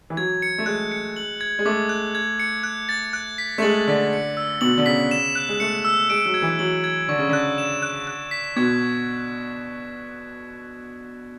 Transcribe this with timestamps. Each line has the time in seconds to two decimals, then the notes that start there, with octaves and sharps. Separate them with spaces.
0.10 E3
0.17 F#3 G#6
0.42 C#7
0.58 A3
0.66 G#3 F#6
0.92 C#7
1.16 F#7
1.41 G#6
1.59 G#3
1.65 A3 D6
1.89 F#6
2.15 G#6
2.40 C#7
2.64 F#6
2.89 A6
3.13 F#6
3.38 B6
3.58 A3
3.62 G#3 F#7
3.87 D3 B6
4.13 C#7
4.37 E6
4.61 B2 F#7
4.78 D3
4.86 C#3 B6
5.11 E7
5.35 F#6
5.48 G#3
5.60 A3 C#7
5.85 E6
6.10 G#3 D7
6.26 F#3
6.34 G#6
6.42 E3
6.59 F#3 F#7
6.84 G#6
7.08 D3 C#6
7.18 C#3
7.29 D3 F#6
7.58 E7
7.82 F#6
8.07 F#6
8.31 B6
8.56 B2 G#6